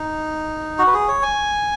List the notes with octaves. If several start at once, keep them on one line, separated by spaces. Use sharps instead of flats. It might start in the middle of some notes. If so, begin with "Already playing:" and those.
Already playing: D#4
F#4
B4
G#4
C#5
G#5